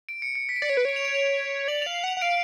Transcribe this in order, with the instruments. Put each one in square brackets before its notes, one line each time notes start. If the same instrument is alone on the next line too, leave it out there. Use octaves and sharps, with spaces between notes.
[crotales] D7
C#7
C#7
B6
D7
[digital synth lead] D5 [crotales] C#7
[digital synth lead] C#5
B4
[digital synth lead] C#5 [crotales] D7
[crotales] F7
D7
F7
[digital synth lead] D5 [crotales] F#7
[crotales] F7
[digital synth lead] F5
[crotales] F7
[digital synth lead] F#5
[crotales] F7
[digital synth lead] F#5
[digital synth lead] F5 [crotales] D7